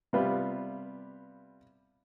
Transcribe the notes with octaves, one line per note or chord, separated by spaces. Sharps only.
C3 G3 B3 F4